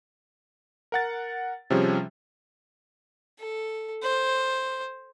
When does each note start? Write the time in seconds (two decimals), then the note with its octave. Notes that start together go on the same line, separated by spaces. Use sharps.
0.92 A#4 F#5 A6
1.70 C3 F3 G3 C#4 G#4
3.39 A4
4.03 C5